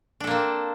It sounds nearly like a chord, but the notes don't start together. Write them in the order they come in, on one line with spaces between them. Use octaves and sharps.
D4 A4 A#3 C4